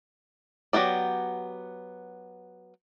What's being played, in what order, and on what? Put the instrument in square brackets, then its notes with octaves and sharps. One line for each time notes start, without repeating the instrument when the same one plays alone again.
[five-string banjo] F#3 B3 G4 D5